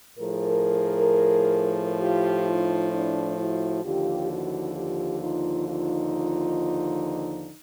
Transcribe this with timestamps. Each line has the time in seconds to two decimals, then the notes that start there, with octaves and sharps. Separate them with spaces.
0.18 A2 F3 G#4 A#4
2.01 F4 G4
2.47 D#4 F4
2.93 D4 E4
3.38 E4 F#4
3.84 D#2 D3 F3 F4 G4
4.30 E4 F#4
4.75 F4 G4
5.21 D#4 F4
5.67 D#4 F4